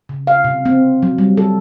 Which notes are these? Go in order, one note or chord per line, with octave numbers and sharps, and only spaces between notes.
C#3
F5
C3
C4
F#3
G3
A4